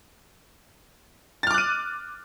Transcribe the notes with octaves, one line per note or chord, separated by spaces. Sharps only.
D6 F6 F#6 A6 D#7